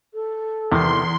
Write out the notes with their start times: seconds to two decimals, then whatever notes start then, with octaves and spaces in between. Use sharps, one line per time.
0.14 A4
0.72 E2 C3 D#3 C6